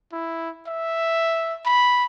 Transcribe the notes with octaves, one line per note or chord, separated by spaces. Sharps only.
E4
E5
B5